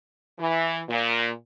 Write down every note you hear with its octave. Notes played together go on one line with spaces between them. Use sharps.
E3
A#2